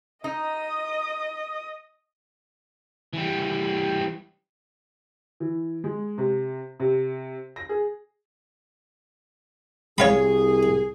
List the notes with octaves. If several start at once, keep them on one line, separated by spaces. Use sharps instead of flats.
D#4 D#5 D#6
E3 G3
E3
G#3
C3
C3
A#6
G#4
C2 G#4 C#5 F5 B5